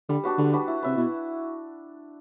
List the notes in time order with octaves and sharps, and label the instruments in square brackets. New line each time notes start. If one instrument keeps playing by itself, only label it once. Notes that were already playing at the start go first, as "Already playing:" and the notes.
[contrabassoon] D3 [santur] G3
[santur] D4 F#4 B4
[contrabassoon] D3 [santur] G3
[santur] D4 F#4 B4
E4
[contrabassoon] C3 [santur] B4 E5
[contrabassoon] B2 [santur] E4